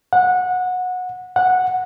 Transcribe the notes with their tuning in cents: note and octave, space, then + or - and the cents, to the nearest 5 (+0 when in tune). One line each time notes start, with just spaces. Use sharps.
F#5 -20
F#5 -10